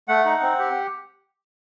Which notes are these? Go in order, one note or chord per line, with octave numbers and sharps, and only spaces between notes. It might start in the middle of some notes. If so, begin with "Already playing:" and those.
A3 F#5
D#4
C4
G4